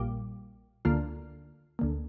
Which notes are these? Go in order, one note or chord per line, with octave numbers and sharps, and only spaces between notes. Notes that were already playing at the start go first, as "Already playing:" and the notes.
Already playing: A#1 A#2 G3
D2 D3 A#3 F4
D2 D3 A#3